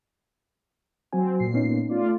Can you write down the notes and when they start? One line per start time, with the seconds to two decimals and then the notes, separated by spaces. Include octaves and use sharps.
1.13 F#3 C4 F#4 G#5
1.40 A#2 C7
1.54 B3 C#4 D#4
1.89 A3 F4 D5